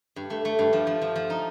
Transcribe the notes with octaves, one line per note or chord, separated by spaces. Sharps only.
G2
A3
A3
G2
F3
F3
F3
F3
D#4